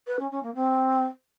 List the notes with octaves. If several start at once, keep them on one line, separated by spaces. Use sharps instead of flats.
B4
C#4
C#4
A#3
C4